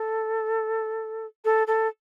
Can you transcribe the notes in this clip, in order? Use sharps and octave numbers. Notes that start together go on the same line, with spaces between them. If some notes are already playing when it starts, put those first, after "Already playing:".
Already playing: A4
A4
A4